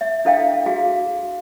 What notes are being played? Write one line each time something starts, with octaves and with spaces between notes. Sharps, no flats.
E5
D4 E4 A4 E5 F5 G5
F#4 G#4 F5